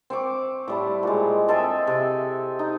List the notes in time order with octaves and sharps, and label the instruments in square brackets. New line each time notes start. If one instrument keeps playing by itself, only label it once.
[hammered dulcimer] C4 C#6 D6
A2 G3 A3
A#2 G#3
C4 A4 D#5 E5
C3
D#4